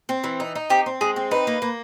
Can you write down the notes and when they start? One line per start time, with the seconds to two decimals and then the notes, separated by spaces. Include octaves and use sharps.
0.09 C4
0.24 E3
0.40 D#4
0.55 D#4
0.70 C4 G4
0.86 C4
1.01 G#3 G#4
1.16 C4
1.31 D#4 B4
1.47 A#3
1.62 A#3